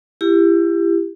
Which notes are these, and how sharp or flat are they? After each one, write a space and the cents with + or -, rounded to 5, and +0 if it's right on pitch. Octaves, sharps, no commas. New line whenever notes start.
E4 +30 G4 +20